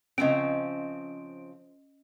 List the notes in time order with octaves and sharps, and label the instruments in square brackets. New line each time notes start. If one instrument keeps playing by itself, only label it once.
[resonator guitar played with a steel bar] C#3 F3 C4 [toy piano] C#4 D#5 [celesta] D7